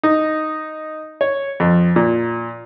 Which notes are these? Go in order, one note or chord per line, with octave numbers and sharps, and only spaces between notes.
D#4
C#5
F2
A#2